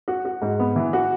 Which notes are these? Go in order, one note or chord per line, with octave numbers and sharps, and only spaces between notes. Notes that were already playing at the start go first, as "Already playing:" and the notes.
F#4
F#4
G#2
B3
E3
F#4